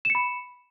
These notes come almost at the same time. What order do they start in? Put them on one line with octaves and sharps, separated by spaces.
E7 C#7 B5